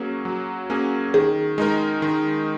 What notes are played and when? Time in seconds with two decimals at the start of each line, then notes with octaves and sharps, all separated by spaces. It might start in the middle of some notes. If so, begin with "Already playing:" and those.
Already playing: F#3 A#3 C#4 G#4
0.25 F#3
0.70 A#3 C#4 G#4
1.14 D#3 G#4
1.58 G#3 D#4 A#4
2.02 D#3